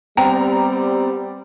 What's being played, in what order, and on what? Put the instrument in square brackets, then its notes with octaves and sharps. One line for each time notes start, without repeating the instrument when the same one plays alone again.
[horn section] G3 [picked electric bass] B3 C4 [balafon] G5 [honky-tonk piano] A#5